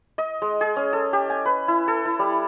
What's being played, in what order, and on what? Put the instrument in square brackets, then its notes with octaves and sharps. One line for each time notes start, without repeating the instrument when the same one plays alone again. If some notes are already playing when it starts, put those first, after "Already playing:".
[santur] D#5
G#3
G#4
C#4
A4
G4
G#5
B4
E4
A4
E4
G3